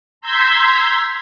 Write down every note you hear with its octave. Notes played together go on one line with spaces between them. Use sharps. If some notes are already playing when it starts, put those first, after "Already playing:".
A#5 C6 E6 G6 G#6 B6